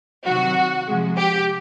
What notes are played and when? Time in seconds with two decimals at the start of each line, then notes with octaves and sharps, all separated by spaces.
0.25 C3 D#3 F#3 F#4
0.87 C3 F3 G#3
1.17 G4